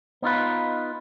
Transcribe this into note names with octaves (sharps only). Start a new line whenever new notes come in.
B3 D#4 F4 B4